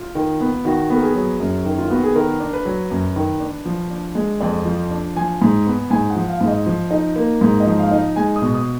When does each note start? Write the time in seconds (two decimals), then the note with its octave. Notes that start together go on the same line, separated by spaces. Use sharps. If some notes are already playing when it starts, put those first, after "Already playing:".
Already playing: F4
0.15 D#3
0.40 B3
0.65 D#3 F#4
0.90 B3 A#4
1.03 G#4
1.15 F#3
1.40 F#2
1.65 D#3
1.78 F4
1.90 B3 F#4
2.03 G#4
2.15 D#3 A#4
2.40 D4
2.53 B4
2.65 F#3
2.91 F#2
3.16 D#3
3.40 D4
3.66 F3
3.91 D4
4.15 G#3
4.41 F2 D5
4.65 F3
4.91 D4
5.16 F3 G#5
5.42 G#2
5.67 B3
5.90 G#2 G#5
6.10 F#5
6.16 F3
6.29 F5
6.41 G#2
6.48 D#5
6.66 F3
6.91 D#4
7.16 A#3
7.41 G#2
7.60 D#5
7.66 F3
7.79 F5
7.91 D#4
8.16 G#3 G#5
8.36 D#6
8.42 B2
8.54 D#6